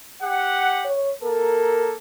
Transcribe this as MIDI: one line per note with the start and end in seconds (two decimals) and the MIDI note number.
0.23 0.88 67
0.23 0.88 78
0.85 1.12 73
1.23 1.95 58
1.23 1.95 69
1.23 1.93 70